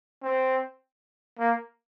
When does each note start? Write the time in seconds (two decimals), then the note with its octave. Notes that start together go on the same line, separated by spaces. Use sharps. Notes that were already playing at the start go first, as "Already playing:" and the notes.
0.23 C4
1.39 A#3